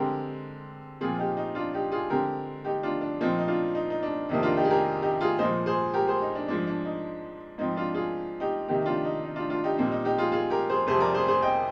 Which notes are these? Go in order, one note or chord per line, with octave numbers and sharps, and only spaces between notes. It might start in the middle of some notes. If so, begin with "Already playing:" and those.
Already playing: D3 G#3 C4 G4 A#4
A#2 F3 C4 F4 G#4
D#4 G4
D#4
D4 F4
D#4 G4
F4 G#4
D3 G#3 C4 G4 A#4
D#4 G4
D4 F4
D4
A#2 F3 C4 D#4
D#4
D4 F4
D#4
D#4
D4
F2 C3 D#3 A#3 D#4
D4 F4
D#4 G4
G#4
G4 A#4
D#4 G4
F4 G#4
A#2 F3 G#3 C5 D#5
G#4 C5
G4 A#4
G#4 C5
D#4
D4
G#2 F3 G#3 D4
D4
D#4
G#2 F3 C4 D#4
D4 F4
F4 G#4
D#4 G4
C3 D#3 A#3 D#4 G4
D4 F4
D#4
D#4
D4 F4
D4 F4
D#4 G4
A#2 G3 C4 D#4
D#4
D#4 G4
F4 G#4
F4 G#4
G4 A#4
G#4 C5
F2 C3 G3 G#4 C5
A#4 D5
G#4 C5
G#4 C5
D#5 G5